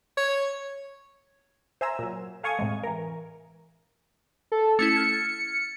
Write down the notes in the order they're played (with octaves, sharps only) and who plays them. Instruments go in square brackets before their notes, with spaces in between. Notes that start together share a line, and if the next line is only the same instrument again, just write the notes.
[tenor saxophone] C#5
[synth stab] C5 E5 G#5 A#5 E6
A#2 F#3
A4 F5 G#5 C#6 D#6 G#6
A2 C3 G#3
E3 A#4
[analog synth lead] A4
[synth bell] A3 C#4 E4 [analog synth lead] C#7
[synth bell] F6 G#6 A6